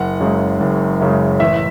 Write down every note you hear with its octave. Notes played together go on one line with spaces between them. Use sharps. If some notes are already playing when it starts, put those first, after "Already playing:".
Already playing: F#1 F#5
F#2 C#3 G#3
F#1
F#2 C#3 G#3
A1 E5